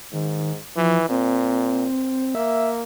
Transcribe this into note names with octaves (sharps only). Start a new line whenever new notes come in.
G#2 D#3
E3 F3
A#2 C4
A#3 E5